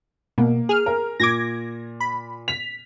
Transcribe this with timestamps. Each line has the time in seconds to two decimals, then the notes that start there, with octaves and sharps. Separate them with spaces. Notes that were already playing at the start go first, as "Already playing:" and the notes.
0.38 B2 A#3
0.69 G#4 F6
0.86 A#4
1.20 A#2 D6 G#6 A#6
2.00 B5
2.48 B6 F7